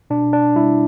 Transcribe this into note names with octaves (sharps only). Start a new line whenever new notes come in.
B2 D4
D4
G3 E4